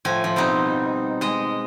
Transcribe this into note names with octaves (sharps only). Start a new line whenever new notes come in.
A2 F3 G#5
F3
B2 G3 C4 D#4
G#3 D#5